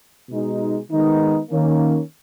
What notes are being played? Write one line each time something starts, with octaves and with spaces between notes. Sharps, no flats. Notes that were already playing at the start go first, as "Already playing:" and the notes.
B2 G#3 D#4
D#3 G#3 B3 D#4
D#3 A#3 C#4